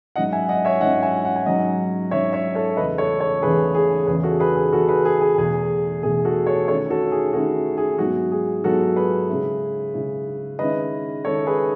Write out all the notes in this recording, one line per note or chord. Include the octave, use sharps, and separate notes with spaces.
G#2 F#3 C#4 E4 D#5 F#5
E5 G#5
D#5 F#5
C#5 E5
G#2 F#3 C#4 E4 D#5 F#5
E5 G#5
F#5
G#5
G#2 F#3 C#4 D#5 F#5
G#2 F#3 C#4 C#5 E5
C#5 E5
A4 C#5
E2 C#3 E3 A3 B4 D#5
A4 C#5
A4 C#5
E2 C#3 E3 A3 G#4 B4
G#4
E2 C#3 E3 G#4 B4
F#4 A4
G#4 B4
G#4
E2 C#3 E3 F#4 A4
G#4 B4
G#4
G#4
E2 B2 A3 G#4
E2 B2 A3 G#4
F#4 A4
A4 C#5
D#3 A3 C#4 E4 A4 C#5
F#4 A4
G#4
D#3 A3 C#4 E4 F#4
G#4
G#2 F#3 B3 E4 F#4
G#4
G#2 F#3 B3 E4 F#4 A4
G#4 B4
C#3 G#3 C#4 E4
C#3 G#3 C#4 E4
D#3 G#3 C#4 E4 B4 D#5
D#3 G#3 C#4 E4 A4 C#5
G#4 B4